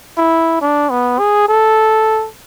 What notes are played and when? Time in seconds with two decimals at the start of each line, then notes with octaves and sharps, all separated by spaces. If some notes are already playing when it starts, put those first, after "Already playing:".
0.18 E4
0.61 D4
0.90 B3
1.19 G#4
1.49 A4